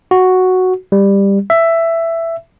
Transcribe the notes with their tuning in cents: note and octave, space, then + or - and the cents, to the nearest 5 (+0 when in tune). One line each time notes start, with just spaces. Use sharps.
F#4 +0
G3 +15
E5 +10